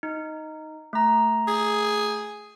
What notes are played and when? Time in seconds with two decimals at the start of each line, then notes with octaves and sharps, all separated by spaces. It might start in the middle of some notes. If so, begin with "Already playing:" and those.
0.03 D#4
0.93 A3 A#5
1.47 G#4